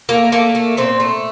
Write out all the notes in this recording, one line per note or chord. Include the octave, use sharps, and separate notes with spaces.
A3 A#3
A3 A#3
A3
A#2 C4
A3